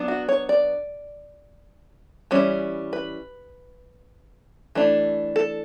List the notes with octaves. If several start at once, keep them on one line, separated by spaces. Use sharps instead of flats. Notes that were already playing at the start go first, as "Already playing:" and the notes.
Already playing: F#3 B3 D4
F#4
C#5
D5
E3 G3 C#4
B4
E3 A3 D4
A4